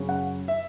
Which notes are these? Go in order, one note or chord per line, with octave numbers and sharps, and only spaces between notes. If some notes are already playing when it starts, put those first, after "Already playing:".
Already playing: F#2 C#3 F#3 C#4
F#5
E5